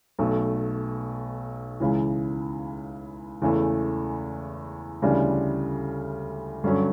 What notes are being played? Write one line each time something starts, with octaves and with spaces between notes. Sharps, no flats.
B1 B2 A3
C#2 C#3 E3
E2 C#3 E3 A3
D2 C#3 E3 G3 D4
G2 D3 F#3 C#4